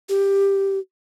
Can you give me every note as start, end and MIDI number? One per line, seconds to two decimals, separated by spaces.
0.09 0.79 67